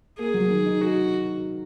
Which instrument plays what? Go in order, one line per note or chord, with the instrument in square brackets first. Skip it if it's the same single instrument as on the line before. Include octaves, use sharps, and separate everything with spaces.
[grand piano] A#3 [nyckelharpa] G#4
[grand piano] F#3
D#3
D#4
[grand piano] D#4 [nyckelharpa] F#4